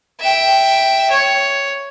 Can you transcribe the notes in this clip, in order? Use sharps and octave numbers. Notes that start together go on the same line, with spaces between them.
E5 G5
C#5